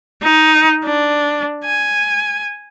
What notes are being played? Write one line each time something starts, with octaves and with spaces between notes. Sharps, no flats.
D#4
D4
G#5